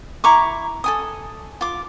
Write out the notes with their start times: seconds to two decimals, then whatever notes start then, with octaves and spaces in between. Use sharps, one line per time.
0.24 E4 A#5 C#6 D6
0.84 A4 G#5 D#6
1.61 F4 D6